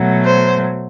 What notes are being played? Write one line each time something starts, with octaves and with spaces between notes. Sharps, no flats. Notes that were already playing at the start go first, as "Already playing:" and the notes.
Already playing: B2 F#3 A3
C5